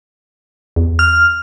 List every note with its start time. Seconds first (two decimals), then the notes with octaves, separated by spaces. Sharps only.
0.76 E2
0.99 F6